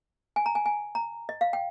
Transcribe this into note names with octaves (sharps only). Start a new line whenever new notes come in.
G#5
A#5
G#5
G#5
A#5
D#5
F5
G5